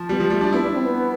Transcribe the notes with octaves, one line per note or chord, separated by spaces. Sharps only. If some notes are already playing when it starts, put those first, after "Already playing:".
Already playing: F3
G3 B3
F3
G3 A3
D4
B3 E4
D4
C4
B3